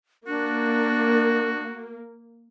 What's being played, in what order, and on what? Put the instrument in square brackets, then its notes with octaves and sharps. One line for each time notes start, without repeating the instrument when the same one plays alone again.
[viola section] A#3 [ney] D4 [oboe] F#4